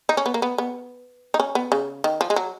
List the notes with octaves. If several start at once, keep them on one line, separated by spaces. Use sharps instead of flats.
D#4
C#4
B3
A#3
B3
B3
D#4
C#4
B3
C#3
D#3
F3
G#3
F#3